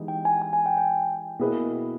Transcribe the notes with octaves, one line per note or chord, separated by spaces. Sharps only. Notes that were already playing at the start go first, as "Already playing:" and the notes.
Already playing: E3 G#3 B3 D#4 G4
G5
G#5
G#5
G#5
G5
G5
B2 A#3 E4 G#4 B4